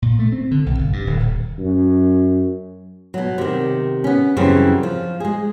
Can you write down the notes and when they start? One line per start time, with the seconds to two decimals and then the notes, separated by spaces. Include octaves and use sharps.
0.02 A#2
0.19 A3
0.32 C4
0.51 D3
0.66 B1
0.79 G1
0.93 G2
1.07 D1
1.20 D#1
1.58 F#2
3.14 B2 F#3
3.38 C3 D#3
4.04 B3 C#4
4.37 F#2 C#3 E3 G3 C4 C#4
4.83 F3
5.20 G#3 G#4